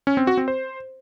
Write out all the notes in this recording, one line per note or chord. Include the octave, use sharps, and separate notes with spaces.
C#4
C4
F#4
C4
C5